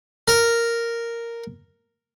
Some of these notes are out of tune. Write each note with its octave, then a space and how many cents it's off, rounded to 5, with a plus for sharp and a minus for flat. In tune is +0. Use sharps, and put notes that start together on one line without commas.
A#4 -5